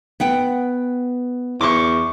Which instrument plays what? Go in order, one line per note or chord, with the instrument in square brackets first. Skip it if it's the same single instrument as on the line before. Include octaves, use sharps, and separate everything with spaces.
[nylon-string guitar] B3 F#5 G5
[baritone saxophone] E2 [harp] C#6 D6